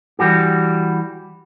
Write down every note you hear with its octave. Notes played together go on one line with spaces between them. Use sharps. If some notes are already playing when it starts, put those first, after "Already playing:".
E3 G3 F#4 G4